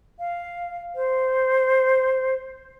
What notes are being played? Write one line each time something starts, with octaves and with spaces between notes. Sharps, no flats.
F5
C5